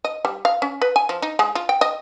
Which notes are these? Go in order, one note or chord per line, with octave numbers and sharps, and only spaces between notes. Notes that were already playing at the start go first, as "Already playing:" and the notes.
D#5
G3
F5
C#4
B4
G#5
F3
D#4
G#3
F4
G5
D#5